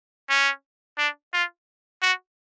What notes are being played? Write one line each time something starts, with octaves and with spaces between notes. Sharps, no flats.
C#4
D4
F4
F#4